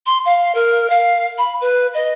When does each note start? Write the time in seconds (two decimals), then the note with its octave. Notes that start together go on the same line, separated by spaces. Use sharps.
0.06 C6
0.25 F5
0.55 A#4
0.90 F5
1.38 B5
1.61 B4
1.94 D#5